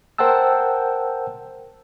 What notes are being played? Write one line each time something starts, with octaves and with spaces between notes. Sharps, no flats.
A#4 C5 F#5 G5 A5 E6